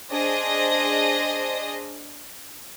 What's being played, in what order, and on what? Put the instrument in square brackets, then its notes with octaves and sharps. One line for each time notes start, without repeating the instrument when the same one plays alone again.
[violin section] D4 G#4 C5 D#5 D#6 A#6